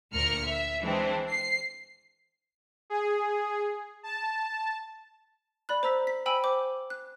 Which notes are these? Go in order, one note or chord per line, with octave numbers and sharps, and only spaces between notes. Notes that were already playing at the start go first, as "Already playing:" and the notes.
D2 A#2 A#4 F6 C#7
E5
E3 G#3 C4 D4
C7
G#4
A5
D5 B5 F#6
C5 A#5 E6 B6
B6
C5 G5 G#5 B5 E6
C5 D6
F#6